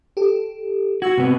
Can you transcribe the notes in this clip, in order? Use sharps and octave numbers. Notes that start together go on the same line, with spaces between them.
G4 A4
F#4 C#6 E6 G#6
C3 B3